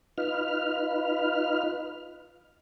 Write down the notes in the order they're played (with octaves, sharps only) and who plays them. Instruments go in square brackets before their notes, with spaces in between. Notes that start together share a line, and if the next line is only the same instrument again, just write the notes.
[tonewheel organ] D#4 F4 B4 F6